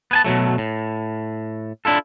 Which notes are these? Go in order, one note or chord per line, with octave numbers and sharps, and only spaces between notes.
B3 G#5 A5
B2 D#3 F#3 A3
A2
D4 E4 F4 A4